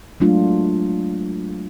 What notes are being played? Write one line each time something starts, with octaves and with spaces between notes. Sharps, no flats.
F#3 G#3 A3 D4 F4